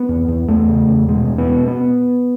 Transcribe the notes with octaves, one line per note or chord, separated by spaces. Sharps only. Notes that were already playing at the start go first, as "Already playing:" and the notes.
Already playing: B3
E2
E2
E2 A3
C#3
E2
B2 G#3
E2
B3
B2
B3